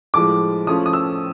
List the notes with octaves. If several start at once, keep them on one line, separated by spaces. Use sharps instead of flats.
A2 F3 G#3 D6
F3 A3 C#4 F4 D#6
D#6
E6